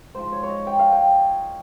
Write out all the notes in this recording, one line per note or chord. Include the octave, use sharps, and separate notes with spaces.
G#2 F3 C5
C#5
C#5
D#5
G5
F5
G5